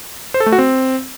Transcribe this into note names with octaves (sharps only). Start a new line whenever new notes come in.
C5
A4
A3
F#4
C4